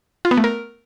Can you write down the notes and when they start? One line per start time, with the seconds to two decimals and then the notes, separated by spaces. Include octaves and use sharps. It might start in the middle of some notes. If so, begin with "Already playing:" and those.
0.25 F4
0.31 B3
0.37 A3
0.44 A#4